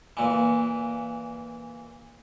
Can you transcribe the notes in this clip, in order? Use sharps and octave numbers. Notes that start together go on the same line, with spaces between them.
A#2 E3